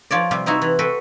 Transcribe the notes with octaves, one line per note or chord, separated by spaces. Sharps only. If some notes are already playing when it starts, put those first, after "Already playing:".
F3 F4 C#5 D5
C3 G3 F5
C4 D#4 E4 F#4
E3
F#4 A4 B4 G5